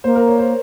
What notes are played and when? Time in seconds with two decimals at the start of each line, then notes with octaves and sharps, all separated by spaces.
0.04 A#3 C5
0.16 A#4
0.27 C#5
0.39 C5